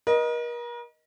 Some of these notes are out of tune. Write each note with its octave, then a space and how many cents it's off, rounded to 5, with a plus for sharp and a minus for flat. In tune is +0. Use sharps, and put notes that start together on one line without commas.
A#4 +40 D#5 +0